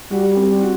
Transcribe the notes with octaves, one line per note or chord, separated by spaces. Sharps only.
G3 F#4
C4
F#4